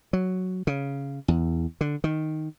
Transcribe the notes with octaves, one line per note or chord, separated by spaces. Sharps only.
F#3
C#3
E2
D3
D#3